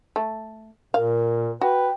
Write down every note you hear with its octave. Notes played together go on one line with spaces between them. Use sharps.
A3
A#2 A#4 F5
F#4 B4 G5